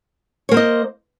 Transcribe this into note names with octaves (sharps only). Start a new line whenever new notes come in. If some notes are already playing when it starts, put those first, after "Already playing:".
A#3 C5 C#5 D#5